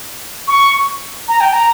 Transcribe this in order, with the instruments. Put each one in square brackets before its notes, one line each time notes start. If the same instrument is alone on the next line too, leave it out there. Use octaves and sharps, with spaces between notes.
[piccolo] C#6
A#5
G5
A#5